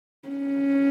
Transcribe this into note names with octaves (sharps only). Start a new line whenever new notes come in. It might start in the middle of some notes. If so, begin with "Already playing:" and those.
C#4